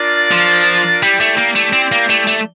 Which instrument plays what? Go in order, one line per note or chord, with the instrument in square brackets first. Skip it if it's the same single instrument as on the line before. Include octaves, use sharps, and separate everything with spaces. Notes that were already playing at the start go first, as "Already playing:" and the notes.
Already playing: [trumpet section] D4 F4 A#4 D5 F5
[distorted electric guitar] F3
[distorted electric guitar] G3 [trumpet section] E4 G4 D5 G5
[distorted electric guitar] A3
A#3
A3
C4
A#3
A3
A3